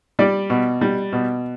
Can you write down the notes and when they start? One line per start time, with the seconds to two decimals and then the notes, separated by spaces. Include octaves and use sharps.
0.19 G3 D5
0.50 B2
0.81 G3
1.13 B2